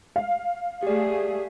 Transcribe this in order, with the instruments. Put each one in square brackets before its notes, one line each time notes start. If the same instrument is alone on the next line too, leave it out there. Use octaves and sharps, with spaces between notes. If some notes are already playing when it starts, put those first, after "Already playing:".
[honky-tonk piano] F5
[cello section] A3 G#4 [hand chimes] G4 D5